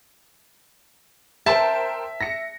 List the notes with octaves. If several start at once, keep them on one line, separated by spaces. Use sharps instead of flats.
A#4 C5 E5 G5 A5
A#6 C#7